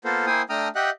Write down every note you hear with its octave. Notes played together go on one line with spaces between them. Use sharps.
A#3 B3 F4 A4 A#4 C5
A#3 E4 C5 G5 G#5 D#6
A3 D4 G5 A#5 D#6 F6
G4 D#5 E5 F#5 G5 F#6